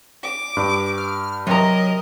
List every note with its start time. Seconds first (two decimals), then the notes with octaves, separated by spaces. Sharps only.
0.23 D6
0.57 G2
0.98 F6
1.47 C3 F#3 A#4 D#5 A#5